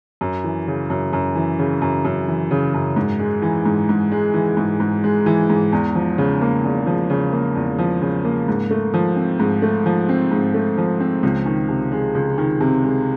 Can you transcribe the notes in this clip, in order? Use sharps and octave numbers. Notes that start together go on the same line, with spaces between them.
F#2
E3
C#3
F#2
F#2
E3
C#3
F#2
F#2
E3
C#3
F#2
G#2
G#3
E3
G#2
G#2
G#3
E3
G#2
G#2
G#3
E3
G#2
E2
F3
C#3
A#3
E2
F3
C#3
A#3
E2
F3
C#3
A#3
G#2
A3
F3
C4
G#2
A3
F3
C4
G#2
A3
F3
C4
C#2
D#3
C3
G#3
C#2
D#3
C3
G#3